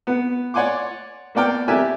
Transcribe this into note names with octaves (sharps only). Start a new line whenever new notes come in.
B3
C#5 D5 F#5 G#5 C6 D6
A#3 B3 D5 G5 F6
G4 A#4 D5 E5 G#5 F#6